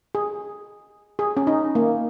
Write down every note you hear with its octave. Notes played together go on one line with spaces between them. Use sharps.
G#4
G#4
C#4
D#4
A#3